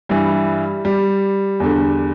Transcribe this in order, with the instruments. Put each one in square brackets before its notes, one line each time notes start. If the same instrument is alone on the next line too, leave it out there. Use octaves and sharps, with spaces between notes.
[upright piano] G2 E3 G3
G3
E2 D3